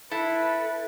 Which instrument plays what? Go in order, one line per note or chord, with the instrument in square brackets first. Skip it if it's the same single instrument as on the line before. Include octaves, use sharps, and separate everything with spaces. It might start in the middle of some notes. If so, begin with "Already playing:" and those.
[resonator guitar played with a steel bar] E4 [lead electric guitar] A4 [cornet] B4